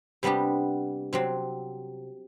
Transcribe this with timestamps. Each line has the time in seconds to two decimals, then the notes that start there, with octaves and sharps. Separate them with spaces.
0.23 C3 G3 B3 D4 G4
1.13 C3 F#3 C4